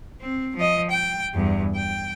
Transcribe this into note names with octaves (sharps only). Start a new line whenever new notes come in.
C4
F3 D#5
G5
E2 G2
G5